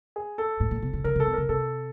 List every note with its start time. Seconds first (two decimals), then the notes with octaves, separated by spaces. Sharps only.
0.16 G#4
0.38 A4
0.60 A2
0.71 A#2
0.82 C3
0.93 C#3
1.04 D3 A#4
1.16 C#3 A4
1.27 C3
1.34 C#3 A#4
1.49 C3 A4